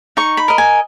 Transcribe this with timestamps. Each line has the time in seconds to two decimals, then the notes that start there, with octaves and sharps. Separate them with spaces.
0.17 D#4 C#6
0.37 B5
0.48 A#4 D#5
0.58 G#5